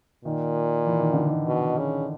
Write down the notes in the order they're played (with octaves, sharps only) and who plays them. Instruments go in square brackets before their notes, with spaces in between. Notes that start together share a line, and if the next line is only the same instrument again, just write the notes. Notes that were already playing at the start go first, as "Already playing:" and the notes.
[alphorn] A#2 [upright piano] D#3
[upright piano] E3
D#3
D3
D#3
[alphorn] B2
C#3